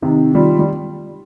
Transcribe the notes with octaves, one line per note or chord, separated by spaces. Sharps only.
C3 D#3 D#4
D#3 G3 F4
G3